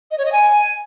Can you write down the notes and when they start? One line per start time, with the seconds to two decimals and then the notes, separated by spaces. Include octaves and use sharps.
0.11 D#5
0.18 C#5
0.25 D#5
0.32 G#5